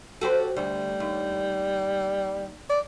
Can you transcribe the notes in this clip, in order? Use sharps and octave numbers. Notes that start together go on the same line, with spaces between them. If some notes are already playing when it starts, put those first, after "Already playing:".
F#4 G4 A4 C5
D2 G3
D#2
D5